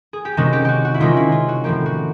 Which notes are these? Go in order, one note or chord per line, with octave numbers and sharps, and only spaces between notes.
G#4
G4
C3 D#3 G#3 C#4 F#4
G4
F#4 G4
F#4
E4
C3 D#3 G#3 C#4 F4
E4
F4
F#4
A2 F3 A#3 G4
F#4